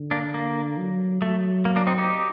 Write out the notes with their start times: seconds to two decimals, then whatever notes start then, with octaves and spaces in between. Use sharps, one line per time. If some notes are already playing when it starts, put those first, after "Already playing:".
Already playing: D3
0.11 A#3 D4
0.34 A#3
0.78 F#3
1.22 F#3 A3
1.65 A#3
1.76 A#3 D4
1.87 C4 D#4
1.98 D#4 G4